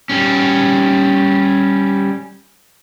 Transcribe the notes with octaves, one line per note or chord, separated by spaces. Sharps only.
G3 C#4